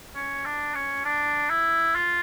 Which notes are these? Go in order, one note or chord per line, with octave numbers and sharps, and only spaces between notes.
C#4
D4
C#4
D4
E4
F4